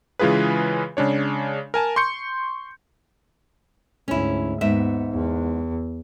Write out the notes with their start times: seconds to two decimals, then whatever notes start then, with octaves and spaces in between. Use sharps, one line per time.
0.19 C#3 E3 G#3 F4 G#4 B4
0.97 C#3 G#3 D4 C#5
1.74 A#4 G#5 A5
1.96 C6 C#6 G6 C#7
4.08 D2 G#2 C#4 E4
4.61 D#2 G#2 B3 E5
5.11 E2